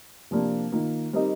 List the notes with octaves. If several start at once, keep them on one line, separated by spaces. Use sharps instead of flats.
C3 F3 A#3 D4
D#3 A#3 F4
G3 C4 D#4 A#4 D#5